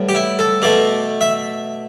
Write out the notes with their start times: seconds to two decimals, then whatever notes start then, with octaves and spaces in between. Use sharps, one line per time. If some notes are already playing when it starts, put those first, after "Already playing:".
Already playing: A2 G3 B3
0.09 G4
0.15 E4
0.39 A4
0.62 B2 A3 D5
1.21 E5